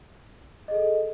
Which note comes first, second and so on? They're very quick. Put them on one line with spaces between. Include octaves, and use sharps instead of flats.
D#5 G#4 A4